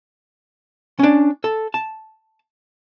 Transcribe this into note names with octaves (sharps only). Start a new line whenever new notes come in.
C#4 D4
A4
A5